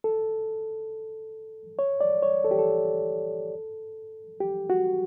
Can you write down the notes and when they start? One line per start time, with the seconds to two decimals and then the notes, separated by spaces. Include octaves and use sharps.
0.04 A4
1.79 C#5
2.01 D5
2.23 C#5
2.44 A4
2.51 G4
2.59 A4
4.41 G4
4.70 F#4